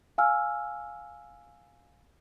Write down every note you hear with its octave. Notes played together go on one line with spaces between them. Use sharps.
F5 G#5 E6 F6